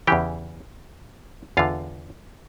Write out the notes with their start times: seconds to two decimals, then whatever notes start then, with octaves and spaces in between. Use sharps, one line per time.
0.07 E2 C#3 E3 G4 G5
1.57 E2 D3 F4 F5